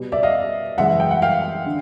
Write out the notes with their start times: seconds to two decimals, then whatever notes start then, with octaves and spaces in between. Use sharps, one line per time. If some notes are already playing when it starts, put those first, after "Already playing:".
Already playing: B2 G3
0.12 D5 E5
0.23 D#5 F5
0.78 F#2 C#3 E3 G#3 E5 F#5
1.00 G5
1.11 F#5
1.22 F5 G5
1.66 D3